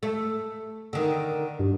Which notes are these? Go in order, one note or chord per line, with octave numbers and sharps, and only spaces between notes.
A3
D3 D#3
G2